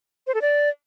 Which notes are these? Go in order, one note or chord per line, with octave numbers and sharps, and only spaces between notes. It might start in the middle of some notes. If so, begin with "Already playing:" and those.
C5
A4
D5